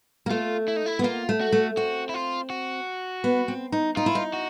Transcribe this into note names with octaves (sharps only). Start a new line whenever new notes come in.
A#3
A3 F4
E4
D#4
E4
B3
A#3 F4
A3
F#4
A3
C4 F#4
E4
F4
F#4
B3
C4
D#4
D#4 F4
E4
D#4
F#4